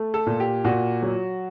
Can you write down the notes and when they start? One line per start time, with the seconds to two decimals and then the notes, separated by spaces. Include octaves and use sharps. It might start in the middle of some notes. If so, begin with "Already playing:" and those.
Already playing: A3
0.14 A4
0.27 A#2
0.40 G4
0.64 A#2 F#4
1.02 F#3